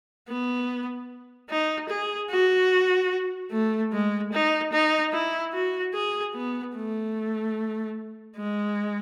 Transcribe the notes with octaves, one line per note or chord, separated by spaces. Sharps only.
B3
D#4
G#4
F#4
A3
G#3
D#4
D#4
E4
F#4
G#4
B3
A3
G#3